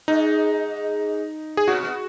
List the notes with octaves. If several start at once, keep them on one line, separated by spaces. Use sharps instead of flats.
G#2 G#3 D#4
G#4
B2 B3 F#4
B3